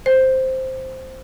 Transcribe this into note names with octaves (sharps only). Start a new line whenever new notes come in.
C5